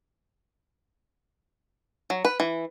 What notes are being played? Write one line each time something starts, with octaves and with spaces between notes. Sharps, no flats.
F#3
B4
E3